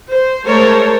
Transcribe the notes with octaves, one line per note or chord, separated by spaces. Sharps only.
C5
G#3 A3 A#4 C5 C#5 A5